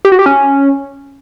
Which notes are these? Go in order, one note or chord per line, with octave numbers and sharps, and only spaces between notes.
G4
F#4
G4
C#4